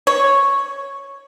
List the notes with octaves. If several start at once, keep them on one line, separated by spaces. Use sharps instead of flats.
C#5